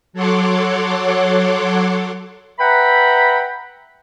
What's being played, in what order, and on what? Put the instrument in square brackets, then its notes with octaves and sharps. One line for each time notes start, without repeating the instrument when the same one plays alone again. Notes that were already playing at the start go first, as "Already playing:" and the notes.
[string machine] F#3 A4 C#5 F#5 C6 D6
[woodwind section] B4 E5 F#5 G5 A#5 B5